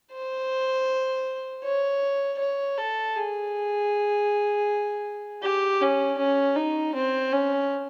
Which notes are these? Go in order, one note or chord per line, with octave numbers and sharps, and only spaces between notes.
C5
C#5
C#5
A4
G#4
G4
C#4
C#4
D#4
C4
C#4